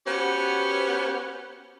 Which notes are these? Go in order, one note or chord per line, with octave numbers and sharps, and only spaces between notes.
B3 C#4 F#4 G4 B4 C5